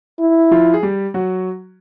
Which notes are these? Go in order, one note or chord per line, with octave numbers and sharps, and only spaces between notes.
E4
F3 F4
G#4
G3 G4
F#3 F#4